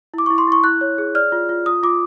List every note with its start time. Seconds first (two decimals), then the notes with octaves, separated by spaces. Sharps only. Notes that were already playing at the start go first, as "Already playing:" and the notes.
0.14 E4 D6
0.26 C#6
0.30 E4
0.38 C6
0.47 E4 C#6
0.64 E4 F#6
0.81 C#5
0.98 G#4
1.15 D5 F6
1.32 F4
1.49 F4
1.66 F4 D#6
1.83 F4 D6